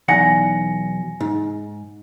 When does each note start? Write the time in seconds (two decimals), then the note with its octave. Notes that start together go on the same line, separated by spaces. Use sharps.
0.08 B1 E2 F#5 G#5 A#6 C#7
1.20 G#2